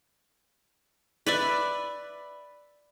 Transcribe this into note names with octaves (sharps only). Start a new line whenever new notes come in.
B4 D5 E5